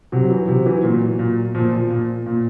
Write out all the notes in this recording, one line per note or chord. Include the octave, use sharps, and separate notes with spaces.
C3 F#3
E3
C3
E3
A#2
A#2
A#2 F3
F3
A#2
A#2